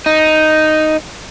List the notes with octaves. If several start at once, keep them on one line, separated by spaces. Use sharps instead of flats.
D#4